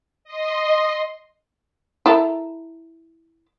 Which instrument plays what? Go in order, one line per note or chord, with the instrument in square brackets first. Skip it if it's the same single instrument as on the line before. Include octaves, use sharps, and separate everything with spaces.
[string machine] D#5 C6
[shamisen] E4 A4 A#4